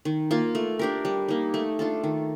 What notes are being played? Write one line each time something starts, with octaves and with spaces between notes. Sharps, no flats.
D#3
A#3 F4
A3
D4 G4 A#4
G3
A#3 D#4
A3
D4 F4 A4
D#3